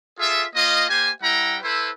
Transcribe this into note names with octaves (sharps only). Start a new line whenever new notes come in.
F4 G#4 A4 E5
A#3 F4 D#5
A#3 G4 C5 G#5
G3 E4 F#5 G5 A#5
E4 A4 B4 C5